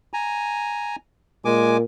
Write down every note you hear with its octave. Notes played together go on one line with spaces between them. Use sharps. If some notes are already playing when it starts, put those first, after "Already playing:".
G#5 A#5
A#2 G#3 G#5 D6